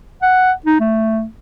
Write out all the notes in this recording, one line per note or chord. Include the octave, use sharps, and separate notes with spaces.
F#5
D#4
A3